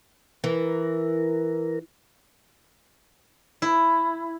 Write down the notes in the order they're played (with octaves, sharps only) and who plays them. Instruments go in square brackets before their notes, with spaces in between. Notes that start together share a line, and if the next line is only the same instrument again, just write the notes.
[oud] E3 [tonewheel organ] A#4
[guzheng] E4